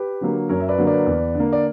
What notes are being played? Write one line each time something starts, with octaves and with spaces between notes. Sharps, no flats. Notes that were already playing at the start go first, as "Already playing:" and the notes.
Already playing: G4 B4
D3 F#3 A#3
F#2 A#4 C#5
E5
B4 D5
D3 F#3 A#3
B4 D5
E2
D3 A#3
D5